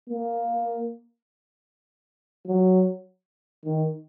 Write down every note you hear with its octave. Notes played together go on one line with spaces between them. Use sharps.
A#3
F#3
D#3